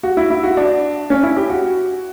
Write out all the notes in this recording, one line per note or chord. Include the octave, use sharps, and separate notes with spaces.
F#4
E4
E4
F#4
D4
C#4
E4
G4
F#4